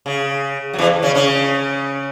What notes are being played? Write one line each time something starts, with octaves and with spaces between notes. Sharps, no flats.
C#3
F#3
E2 E3
C#3 C#4
C#3 C#4